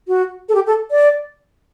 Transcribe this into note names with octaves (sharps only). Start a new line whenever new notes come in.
F#4
A4
G4
A4
D5